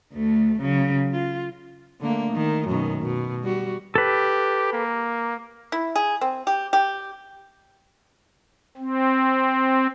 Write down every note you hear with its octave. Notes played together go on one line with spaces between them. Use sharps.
D2 A3
C#3 F#3
F4
D3 A3 A#3
D#3
F#2 B2 D#3
B2
G3 F#4
G4 A4 B4
A#3
E4
G#4
C4
G4
G4
C4